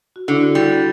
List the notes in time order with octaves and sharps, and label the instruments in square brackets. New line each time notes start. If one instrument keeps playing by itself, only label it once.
[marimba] F#4
[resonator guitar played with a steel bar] D3 [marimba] E4
[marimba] F#4
[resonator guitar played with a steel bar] G3 [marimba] E4
[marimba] F#4